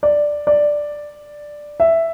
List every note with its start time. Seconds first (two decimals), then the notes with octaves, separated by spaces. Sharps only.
0.03 D5
0.47 D5
1.80 E5